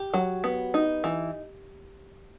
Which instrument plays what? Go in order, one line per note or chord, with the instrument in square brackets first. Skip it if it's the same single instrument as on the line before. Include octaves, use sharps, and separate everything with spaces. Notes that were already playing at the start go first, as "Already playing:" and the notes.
Already playing: [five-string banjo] G4
F#3
B3
D#4
E3